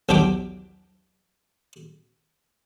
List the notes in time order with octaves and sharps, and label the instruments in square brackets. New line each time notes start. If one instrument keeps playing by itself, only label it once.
[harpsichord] B1 E2 D4 G4 G5 D6